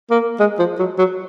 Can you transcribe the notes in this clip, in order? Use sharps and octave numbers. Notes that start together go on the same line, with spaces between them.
A#3
G#3
F3
F#3
F#3